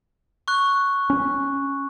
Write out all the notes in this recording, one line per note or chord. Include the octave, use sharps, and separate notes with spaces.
C#6 F#6
C#4